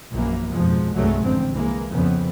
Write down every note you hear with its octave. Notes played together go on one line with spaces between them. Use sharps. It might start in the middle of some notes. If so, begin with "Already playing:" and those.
A#1 F#2 E3 A#3
F2 G#2 B2 F3 G#3
C2 G2 F#3 G#3 A3
A1 F2 D3 C4
C2 E3 G#3 A#3
F2 C#3 B3